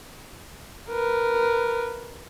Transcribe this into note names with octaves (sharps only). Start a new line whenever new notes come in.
A#4 B4